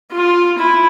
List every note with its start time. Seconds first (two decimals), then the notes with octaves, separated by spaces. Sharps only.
0.11 F4
0.59 E4